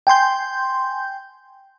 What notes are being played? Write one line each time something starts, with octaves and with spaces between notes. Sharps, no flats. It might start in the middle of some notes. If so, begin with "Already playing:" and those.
G5 G#5 C6 G6